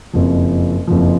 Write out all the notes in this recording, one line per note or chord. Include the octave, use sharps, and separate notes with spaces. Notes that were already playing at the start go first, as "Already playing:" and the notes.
F#1 F2 F3
F#1 F2 F3